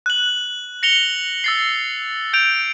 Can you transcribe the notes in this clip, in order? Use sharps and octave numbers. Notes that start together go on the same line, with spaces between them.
F#6 F#7
A#6 C#7 F7 G7
E6 A6 C7
G6 D7 F7